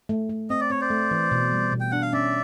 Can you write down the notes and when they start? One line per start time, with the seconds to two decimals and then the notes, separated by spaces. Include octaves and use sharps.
0.09 A3
0.30 A3
0.50 C4 D#5
0.60 D5
0.70 C4 C#5
0.81 C5 D5
0.91 A3
1.11 E3
1.31 B2
1.52 G3
1.72 B2
1.80 G5
1.91 D4 F#5
2.02 F5
2.13 C#4 D5 E5